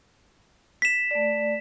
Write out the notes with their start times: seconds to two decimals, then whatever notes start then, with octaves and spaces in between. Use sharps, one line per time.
0.82 B6 E7
1.11 A3 D5